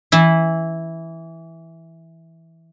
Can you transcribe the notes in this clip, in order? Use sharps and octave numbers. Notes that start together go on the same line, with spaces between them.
E3 E4